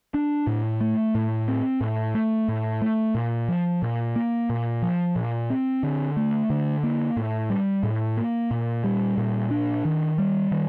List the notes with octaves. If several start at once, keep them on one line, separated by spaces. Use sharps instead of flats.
D4
A2
A3
A2
C4
A2
A3
A2
A3
A#2
F3
A#2
A#3
A#2
F3
A#2
C4
D3
A3
D3
A#3
A2
G3
A2
A#3
A#2
G3
A#2
D4
D#3
G3
D#3